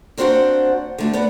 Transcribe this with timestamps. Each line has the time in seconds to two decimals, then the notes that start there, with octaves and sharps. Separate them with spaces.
0.17 A#3 C4 D4 F#4 C5 F#5
0.98 D3 A3 F#4
1.13 B3 D5 F#5